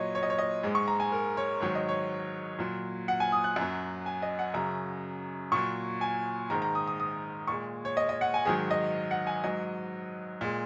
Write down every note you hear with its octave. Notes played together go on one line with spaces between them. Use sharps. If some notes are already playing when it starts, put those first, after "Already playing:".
Already playing: A#2 F#3 C#5 D#5
C#5
D#5
C#5
D#5
G#2 G#3
C#6
A#5
G#5
A#4
C#5
G#2 D#3 F#3 C#5
D#5
C#5
A#2 F#3
F#5
G#5
D#6
F#6
F#2 F#3
G#5
D#5
F#5
F#2 C#3 F#3 A#5
A#2 F#3 C#6
G#5
G#2 D#3 G#3 A#5
A#5
D#6
D#6
D#6
A#2 G#3 C#6
C#5
D#5
D#5
F#5
G#5
G#2 D#3 F#3 G#4
D#5
F#5
G#5
G#2 F#3 D#5
A#2 G#3